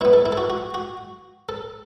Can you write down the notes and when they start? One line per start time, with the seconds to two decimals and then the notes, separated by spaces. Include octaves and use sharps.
0.01 B2 E4
0.05 B3
0.13 A4
0.26 E4
0.32 A4
0.37 F#4
0.50 F#4
0.74 F#4
1.49 A4